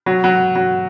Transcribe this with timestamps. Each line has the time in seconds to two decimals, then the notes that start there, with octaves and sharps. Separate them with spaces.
0.06 F#3
0.24 F#3
0.55 F#3